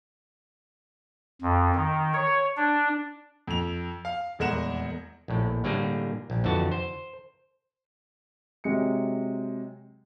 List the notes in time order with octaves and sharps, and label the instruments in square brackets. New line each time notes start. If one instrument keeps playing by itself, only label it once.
[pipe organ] F2
D#3
C#5
D4
[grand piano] F2 F7
F5
D#1 E2 G#3 A#4 F#5 E7
[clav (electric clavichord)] A#1 A2
A2 D3 G3 A#3 G#4
A#1
F2 D3 E3 F#4 A5
C5
[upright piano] C3 F#3 G#3 C#7